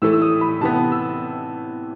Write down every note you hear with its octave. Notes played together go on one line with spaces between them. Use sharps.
A2 E3 A3 E6
E6
D#6
B5
C3 E3 B3 A5
E6